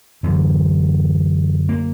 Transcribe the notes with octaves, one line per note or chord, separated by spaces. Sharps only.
F#2 D3 E3
A#3